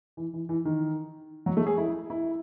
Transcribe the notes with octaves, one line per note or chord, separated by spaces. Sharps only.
E3
E3
E3
D#3
F#3
A3
G#4
E4
E4